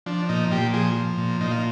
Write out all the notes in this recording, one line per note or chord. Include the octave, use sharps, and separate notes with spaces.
F3 D4
A#2 D#4
A#2 G4
F3 G#4
F3
A#2
A#2 D#4
F4